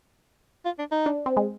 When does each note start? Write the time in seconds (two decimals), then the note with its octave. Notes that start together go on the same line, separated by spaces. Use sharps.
0.65 F4
0.79 D4
0.91 D#4
1.06 D4
1.26 C4
1.37 G#3